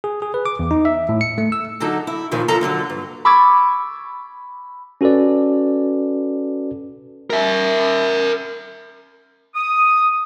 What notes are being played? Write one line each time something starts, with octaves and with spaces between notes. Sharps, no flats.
G#4
G#4
B4
D6
E2
D#4
E5
A2
C#7
A3
E6
D3 F#3 D#4 A4
E4
D#2 A#2 D#3 F3
D#2 F3 A4 A#5
D#2 D3 F#3 A4
G2
B5 C#6 D6 E6 G#6 A6
C#4 F#4 A4 B4 D5
A#4 E5
D#6